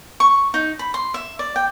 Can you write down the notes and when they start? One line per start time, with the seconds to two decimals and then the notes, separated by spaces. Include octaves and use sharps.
0.20 C#6
0.54 D#4
0.79 B5
0.94 C6
1.14 E5
1.39 D5
1.56 G5